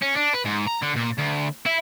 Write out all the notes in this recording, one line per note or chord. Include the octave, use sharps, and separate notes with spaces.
C#4
D4
B4
G#2
A#5
D3
A#2
D2
E4